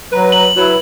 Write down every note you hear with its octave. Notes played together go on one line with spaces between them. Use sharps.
F#3 B4 A#5
F#7
F#3 E4 B4